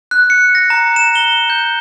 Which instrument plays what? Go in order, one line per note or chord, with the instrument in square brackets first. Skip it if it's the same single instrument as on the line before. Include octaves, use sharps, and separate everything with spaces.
[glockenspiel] F#6
C#7
A#6
A#5
E7
G7
G6